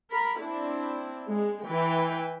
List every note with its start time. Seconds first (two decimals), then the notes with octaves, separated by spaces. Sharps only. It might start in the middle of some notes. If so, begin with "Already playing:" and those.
0.10 A#4 B5
0.41 C4 D4 E4
1.27 G#3
1.65 E3 E4 B4 G5